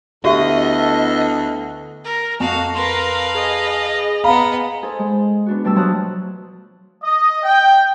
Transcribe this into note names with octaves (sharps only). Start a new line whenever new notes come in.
D2 B3 E4 F#4 G4 A4 D#5 E5
A#4
F2 F#4 F5
A#4 B4 F5 C6
G#4 D#5
B3 D#5 F5 A#5 B5
D#4 G#4 A4 C5 A5
G#3
B3 D4 F#4
B2 G3 A3 G5 A5 E6
F3 F#3 A5 A#5 D#6 F#6
D#5
G5